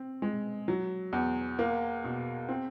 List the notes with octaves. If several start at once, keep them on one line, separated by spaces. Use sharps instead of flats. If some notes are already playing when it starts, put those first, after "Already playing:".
Already playing: C4
G#3
F#3
E2
A#3
B2
C4